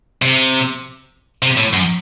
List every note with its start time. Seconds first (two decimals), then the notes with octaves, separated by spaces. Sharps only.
0.22 C3
1.42 C3
1.57 A2
1.73 F#2